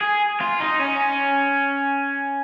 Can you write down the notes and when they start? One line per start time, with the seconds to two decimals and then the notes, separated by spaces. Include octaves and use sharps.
0.01 G#4
0.41 F4
0.60 D#4
0.80 C#4